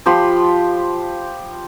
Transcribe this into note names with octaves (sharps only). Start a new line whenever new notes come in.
F3 G4 B5 C6